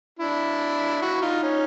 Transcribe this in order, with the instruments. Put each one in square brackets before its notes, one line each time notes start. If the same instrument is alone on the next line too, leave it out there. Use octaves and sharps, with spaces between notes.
[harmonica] D4 E4
E4 F#4
D#4 F4
C#4 D#4